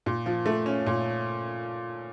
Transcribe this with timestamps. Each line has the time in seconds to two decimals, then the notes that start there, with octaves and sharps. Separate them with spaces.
0.06 A#2
0.26 F3
0.46 A3
0.66 C#4
0.86 A#2